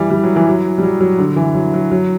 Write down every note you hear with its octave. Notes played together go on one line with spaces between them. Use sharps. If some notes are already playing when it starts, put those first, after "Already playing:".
Already playing: E3 G3
G3
F#3
E3
F#3
G3
F#3
F#3
D3
E3
F#3
F#3
F#3